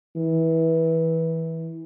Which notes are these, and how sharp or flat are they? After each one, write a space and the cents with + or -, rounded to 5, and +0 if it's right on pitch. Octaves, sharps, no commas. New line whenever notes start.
E3 -20